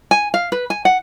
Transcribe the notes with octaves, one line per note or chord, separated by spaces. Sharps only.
G#5
F5
B4
G#5
F#5